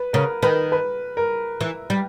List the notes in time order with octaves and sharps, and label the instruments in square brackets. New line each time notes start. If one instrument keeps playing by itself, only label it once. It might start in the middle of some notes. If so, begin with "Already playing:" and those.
Already playing: [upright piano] B4
[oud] C#3 [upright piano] A#4
[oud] D#3 [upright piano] B4
[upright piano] B4
A#4
[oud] E3
G3